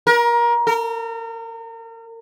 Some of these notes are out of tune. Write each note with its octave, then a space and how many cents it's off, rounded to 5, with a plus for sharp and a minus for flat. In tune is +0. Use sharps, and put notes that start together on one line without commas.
A#4 +25
A#4 -35